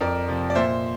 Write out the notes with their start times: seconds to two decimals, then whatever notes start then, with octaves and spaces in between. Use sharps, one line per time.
0.01 F2 A#4 D5
0.28 C3 F3
0.50 D5
0.55 A#2 C5 E5